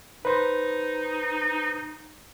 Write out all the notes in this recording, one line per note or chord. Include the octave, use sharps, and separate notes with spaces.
D#4 B4 C5